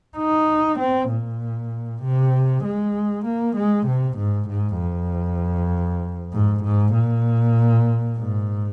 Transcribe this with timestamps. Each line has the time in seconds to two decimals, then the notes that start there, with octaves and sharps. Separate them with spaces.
0.17 D#4
0.79 C4
1.10 A#2
2.02 C3
2.64 G#3
3.25 A#3
3.56 G#3
3.87 C3
4.17 G#2
4.48 G#2
4.79 F2
6.33 G#2
6.63 G#2
6.94 A#2
8.18 G#2